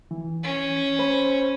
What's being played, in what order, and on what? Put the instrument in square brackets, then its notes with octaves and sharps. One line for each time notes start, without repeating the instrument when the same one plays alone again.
[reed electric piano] E3
[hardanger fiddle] C#4
[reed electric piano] C5 C#5 B5